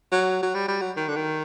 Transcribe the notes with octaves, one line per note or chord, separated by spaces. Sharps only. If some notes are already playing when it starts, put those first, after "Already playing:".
F#3
F#3
G3
G3
F#3
D#3
D3
D#3